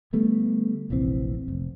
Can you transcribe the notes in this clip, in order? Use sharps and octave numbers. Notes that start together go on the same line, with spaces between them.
D3 G3 A3 B3
F1 A#1 E3 C4
F1